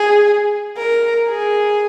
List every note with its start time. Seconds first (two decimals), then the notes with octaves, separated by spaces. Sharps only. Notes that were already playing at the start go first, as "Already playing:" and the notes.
Already playing: G#4
0.77 A#4
1.28 G#4